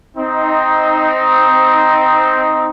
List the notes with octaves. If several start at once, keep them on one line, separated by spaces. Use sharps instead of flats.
C4 D#4